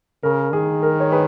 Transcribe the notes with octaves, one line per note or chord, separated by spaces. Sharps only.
C#3 A#4
D#3 G#4
A#4
C#5
G#4 B4